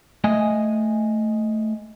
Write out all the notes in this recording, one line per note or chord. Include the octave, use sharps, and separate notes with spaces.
A3 D#5 G#5